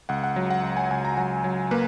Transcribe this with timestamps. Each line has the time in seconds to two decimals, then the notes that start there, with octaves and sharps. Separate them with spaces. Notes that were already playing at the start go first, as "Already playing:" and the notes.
0.09 C#2 F#5
0.24 F#5
0.36 F#3
0.50 F#5
0.63 C#2
0.77 G#5
0.91 C#2 G#5
1.05 A#5
1.17 F#3 G#5
1.44 F#3
1.71 A#3 B4